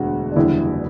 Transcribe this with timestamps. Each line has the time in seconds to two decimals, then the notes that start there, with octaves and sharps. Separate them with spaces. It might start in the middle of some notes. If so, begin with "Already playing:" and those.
Already playing: E1 D2 F#4
0.32 D4
0.36 F#1 E2 D3 G3 E4